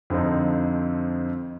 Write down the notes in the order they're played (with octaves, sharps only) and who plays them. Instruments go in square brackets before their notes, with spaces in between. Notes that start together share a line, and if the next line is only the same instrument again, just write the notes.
[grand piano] F2 D3 F3 C4 D#4